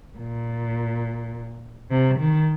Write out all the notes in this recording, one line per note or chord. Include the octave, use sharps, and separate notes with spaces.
A#2
C3
D#3